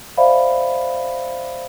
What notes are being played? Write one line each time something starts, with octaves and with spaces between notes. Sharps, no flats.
C5 D5 E5 F5 B5